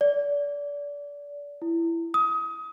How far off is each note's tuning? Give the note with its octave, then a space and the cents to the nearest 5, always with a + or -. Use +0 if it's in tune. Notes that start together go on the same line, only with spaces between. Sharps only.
D5 -30
E4 +15
D#6 +25